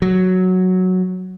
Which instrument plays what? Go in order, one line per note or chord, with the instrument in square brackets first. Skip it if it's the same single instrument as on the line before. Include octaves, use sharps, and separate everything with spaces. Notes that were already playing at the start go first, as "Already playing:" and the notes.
[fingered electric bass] F#3